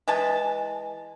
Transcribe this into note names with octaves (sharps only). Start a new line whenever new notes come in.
E3 G#3 A5